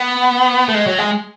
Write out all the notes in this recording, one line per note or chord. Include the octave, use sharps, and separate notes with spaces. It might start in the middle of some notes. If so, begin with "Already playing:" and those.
Already playing: B3
A3
G#3
F#3
G#3